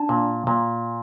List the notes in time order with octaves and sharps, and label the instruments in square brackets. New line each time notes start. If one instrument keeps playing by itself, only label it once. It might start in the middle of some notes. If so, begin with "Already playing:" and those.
Already playing: [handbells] D4 A5
[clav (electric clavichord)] A#2
A#2